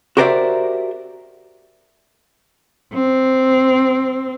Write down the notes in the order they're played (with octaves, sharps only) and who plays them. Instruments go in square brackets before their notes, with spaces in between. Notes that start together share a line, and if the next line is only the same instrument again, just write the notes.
[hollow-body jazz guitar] F#4 G4 A#4 C5 D5 E5
[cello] C4